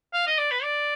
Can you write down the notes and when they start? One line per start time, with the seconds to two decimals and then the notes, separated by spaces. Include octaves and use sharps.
0.14 F5
0.27 D#5
0.38 D5
0.51 B4
0.63 D5